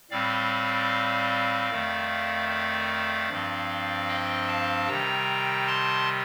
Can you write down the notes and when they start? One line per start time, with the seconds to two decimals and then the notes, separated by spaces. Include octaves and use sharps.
0.11 A2 G3 C4 D5 F5
1.70 F2 D#3 A3
2.49 D5 F5
3.29 G2 F3 C4
4.08 D#5 G5
4.48 F5 A5
4.88 C3 D#3 G3 G5 A#5
5.67 A5 C6